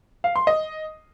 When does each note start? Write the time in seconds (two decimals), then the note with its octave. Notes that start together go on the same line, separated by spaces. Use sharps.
0.24 F5
0.36 C6
0.47 D#5